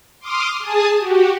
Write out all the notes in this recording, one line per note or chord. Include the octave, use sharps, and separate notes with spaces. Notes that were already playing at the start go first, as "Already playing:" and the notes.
C6 D6 D#6 F6
G#4 G#5 A5 D#6
F#4 G4